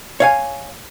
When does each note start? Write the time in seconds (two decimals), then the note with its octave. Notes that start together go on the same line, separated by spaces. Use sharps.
0.20 C#5 F5 G#5